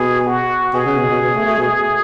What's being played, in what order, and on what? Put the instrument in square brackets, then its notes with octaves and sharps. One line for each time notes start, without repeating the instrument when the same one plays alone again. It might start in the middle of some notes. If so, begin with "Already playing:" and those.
Already playing: [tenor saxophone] B2 [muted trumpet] G#4
[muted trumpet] F#4
[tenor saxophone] B2 [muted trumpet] G#4
[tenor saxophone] C#3
B2
B2
B2
A3
A3
B2